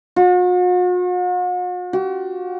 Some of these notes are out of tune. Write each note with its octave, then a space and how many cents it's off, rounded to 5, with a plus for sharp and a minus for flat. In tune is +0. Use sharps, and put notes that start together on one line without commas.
F#4 -45
F#4 +45